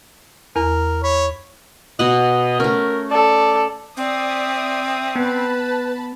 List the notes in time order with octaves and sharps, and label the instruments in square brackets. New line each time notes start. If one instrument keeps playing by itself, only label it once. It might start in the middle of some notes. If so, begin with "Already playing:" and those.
[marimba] E2 [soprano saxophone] A#4
[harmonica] C#5 [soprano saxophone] B5
[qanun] B2 F#5 [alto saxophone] D#5
[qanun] A3 C#4 [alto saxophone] A#4
[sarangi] A4 [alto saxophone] D5
[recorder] C4 [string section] D5 E5 D#6
[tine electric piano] B3 [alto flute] B4 [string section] A5 B5